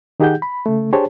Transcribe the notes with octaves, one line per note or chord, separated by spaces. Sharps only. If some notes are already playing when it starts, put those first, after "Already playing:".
D#3 D#4 G4 G#4 F#5 G6
B5
C#3 A3
D4 G4 G#4 C5 C#5 A5